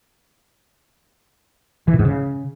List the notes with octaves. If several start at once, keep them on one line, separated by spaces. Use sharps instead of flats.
E3
A#2
G#2
C#3